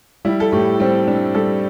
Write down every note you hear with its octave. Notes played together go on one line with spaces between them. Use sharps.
G3 E4
A4
A2 G4
G3 C4
G3 D4
G3 A4